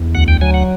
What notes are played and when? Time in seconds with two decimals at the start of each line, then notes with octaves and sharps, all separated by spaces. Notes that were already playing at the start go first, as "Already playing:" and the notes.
Already playing: E2
0.15 D2 F#5
0.28 G5
0.41 F#3 G#5
0.54 F#5